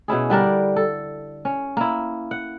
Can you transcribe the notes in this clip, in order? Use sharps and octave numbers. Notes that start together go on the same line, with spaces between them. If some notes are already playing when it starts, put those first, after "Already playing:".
B2 C#4 E4 G#4
D3 G3 D4 A#4
A4
C#4
A#3 E4
F#5